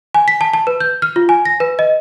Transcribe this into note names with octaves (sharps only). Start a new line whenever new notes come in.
G#5
B6
A5
A5
B4
G6
F6
F4
G#5
A#6
B4
D#5